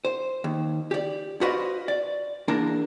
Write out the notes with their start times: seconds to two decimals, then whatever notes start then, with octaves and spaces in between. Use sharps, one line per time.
0.05 C5
0.44 D#2
0.91 G4 D5
1.41 F#4 B4 C5 D5 D#5 F5
1.88 D5
2.48 E2 A#3 D4 A#4